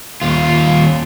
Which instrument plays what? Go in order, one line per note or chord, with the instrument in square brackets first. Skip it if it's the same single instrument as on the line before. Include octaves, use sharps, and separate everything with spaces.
[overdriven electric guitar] D#2 F4